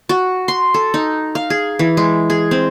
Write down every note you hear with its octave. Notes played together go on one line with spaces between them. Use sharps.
F#4
C6
A4
D#4
F5
G#4
E3
G#3
G#4
C4